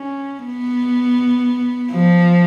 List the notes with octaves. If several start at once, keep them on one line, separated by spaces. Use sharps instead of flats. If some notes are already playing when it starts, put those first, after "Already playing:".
Already playing: C#4
B3
F3